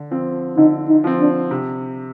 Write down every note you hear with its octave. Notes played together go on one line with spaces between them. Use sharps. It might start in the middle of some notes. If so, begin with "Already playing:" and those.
Already playing: D3
F3 C4
D3 D#4
D#4
F3 C4
D4
C3